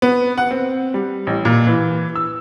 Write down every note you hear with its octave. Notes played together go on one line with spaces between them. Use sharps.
B3
F#5
C4
G3
A1
A#2
E3
E6